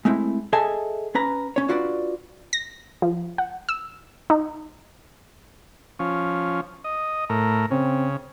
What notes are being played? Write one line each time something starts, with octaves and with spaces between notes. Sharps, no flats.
G#3 A3 C4 E4
G#4 A4 D#5 E5 G#5 A5
C#4 B4 A#5
C#4 C#5
D4 F4 F#4 B4 D5
A#6
F3
F#5
E6
D#4
F3 C#4
D#5
A2 A#4
C#3 C4